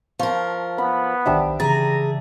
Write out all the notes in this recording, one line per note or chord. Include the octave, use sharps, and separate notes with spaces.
F3 A#4 F5 A5 C#6
B3 B5
B1 D#3 D4 G4 C5 E5
C#3 E3 G#4 A#5 A6